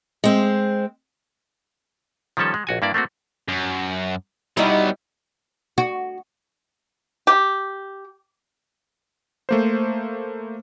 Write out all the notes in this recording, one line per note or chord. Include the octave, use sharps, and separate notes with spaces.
G#3 C4
D#3 F3 G3 C#4 A4
G#3
A#1 F#4 G#5
G2 A#3 E4 D5
A3 A#3 C4 F#4
F#2
F#3 G3 B3 D#4 E4
F#4
G4
A3 A#3 C5